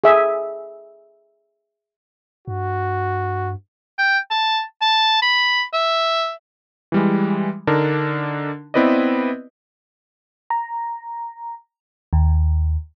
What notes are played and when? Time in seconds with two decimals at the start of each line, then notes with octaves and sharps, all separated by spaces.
0.04 G#4 E5
2.48 G2 F#4
3.99 G5
4.31 A5
4.81 A5
5.22 B5
5.74 E5
6.92 E3 G3 G#3
7.67 D3 D4 D#4 A#4
8.74 B3 C4 E4 B4 D5 D#5
10.50 A#5
12.13 D#2